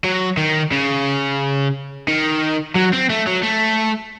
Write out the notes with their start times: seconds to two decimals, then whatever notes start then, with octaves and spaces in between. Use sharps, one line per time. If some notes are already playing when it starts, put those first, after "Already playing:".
0.04 F#3
0.37 D#3
0.72 C#3
2.08 D#3
2.75 F#3
2.93 C4
3.10 A3
3.27 F#3
3.43 A3